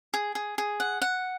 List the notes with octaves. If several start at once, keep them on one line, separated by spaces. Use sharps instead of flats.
G#4
G#4
G#4
F#5
F#5